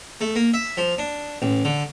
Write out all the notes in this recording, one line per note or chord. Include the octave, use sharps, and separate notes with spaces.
A3
A#3
E5
F3
D4
A1
D3